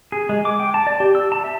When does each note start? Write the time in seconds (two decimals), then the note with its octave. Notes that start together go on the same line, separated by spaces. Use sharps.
0.12 G#4
0.29 G#3
0.45 D6
0.60 G5
0.74 A5
0.87 D5
1.00 G4
1.15 E6
1.32 A5
1.44 E5